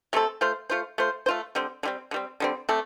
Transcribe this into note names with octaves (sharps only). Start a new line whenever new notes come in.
C3 A3 C4 A4
A3 F4 C5
A3 F4 C5
A3 F4 C5
A3 F4 C5
D3 G3 C4
D3 G3 C4
D3
G3 C4
D3 G3 C4
A3 C4 A4 D5